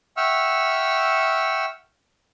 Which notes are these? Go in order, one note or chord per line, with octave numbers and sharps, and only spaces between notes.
E5 F#5 G5 C#6 E6 F6